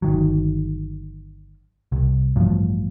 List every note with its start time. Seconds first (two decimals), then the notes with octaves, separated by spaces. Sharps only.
0.02 G1 D#3 F#3
1.92 C2
2.36 A1 G2 F3